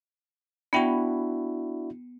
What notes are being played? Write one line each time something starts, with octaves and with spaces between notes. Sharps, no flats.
B3 D4 E4 F#4 G5